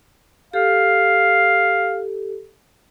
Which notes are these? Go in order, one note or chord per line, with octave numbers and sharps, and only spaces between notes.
G4 A4 F5